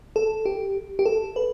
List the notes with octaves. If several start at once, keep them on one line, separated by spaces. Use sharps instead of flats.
A4
G4
G4
A4
B4